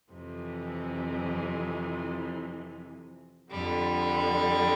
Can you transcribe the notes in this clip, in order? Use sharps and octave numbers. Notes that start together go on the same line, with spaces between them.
F2 C3 E3
F2 D3 G3